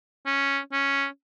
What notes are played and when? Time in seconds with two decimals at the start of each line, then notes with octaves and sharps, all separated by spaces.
0.26 C#4
0.73 C#4